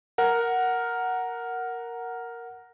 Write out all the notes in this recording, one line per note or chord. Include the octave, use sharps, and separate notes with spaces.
A#4 F#5